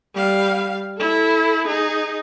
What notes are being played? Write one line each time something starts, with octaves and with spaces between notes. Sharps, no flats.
G3 F5
E4 A4
D#4 G#4